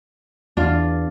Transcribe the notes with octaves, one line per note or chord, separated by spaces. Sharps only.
E2 D4 F4